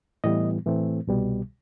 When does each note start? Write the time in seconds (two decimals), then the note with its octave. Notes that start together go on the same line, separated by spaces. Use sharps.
0.24 A2 E3 G3 B3 D#5
0.66 A2 E3 A3 C4
1.07 C2 B2 G3